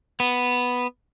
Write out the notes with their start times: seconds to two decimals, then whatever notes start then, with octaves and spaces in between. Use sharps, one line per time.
0.20 B3